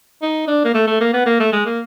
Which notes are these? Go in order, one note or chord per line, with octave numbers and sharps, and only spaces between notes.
D#4
D4
A#3
A3
A3
A#3
B3
A#3
A3
G#3
A#3